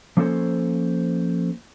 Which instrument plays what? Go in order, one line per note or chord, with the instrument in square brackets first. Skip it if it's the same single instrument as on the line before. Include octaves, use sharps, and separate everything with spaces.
[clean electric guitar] F3 A#3 C#4 A4 C5 C#5